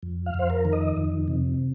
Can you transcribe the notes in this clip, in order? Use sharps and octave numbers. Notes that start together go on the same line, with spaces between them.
F2
F5
F2 C5
A#4
D#3
D#5
F2
C3